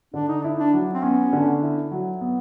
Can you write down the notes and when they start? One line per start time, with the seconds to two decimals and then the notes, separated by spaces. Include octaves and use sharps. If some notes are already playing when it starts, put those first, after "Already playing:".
0.14 D3 D4
0.28 D#4
0.42 D4 E4
0.59 D4
0.73 F#3
0.94 C4
1.03 B3 C#4
1.33 D3
1.62 E4
1.91 F#3
2.21 B3